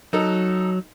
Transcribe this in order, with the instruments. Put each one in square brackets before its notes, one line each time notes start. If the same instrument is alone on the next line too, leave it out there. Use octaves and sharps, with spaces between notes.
[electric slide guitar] F#3 [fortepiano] D#4 A4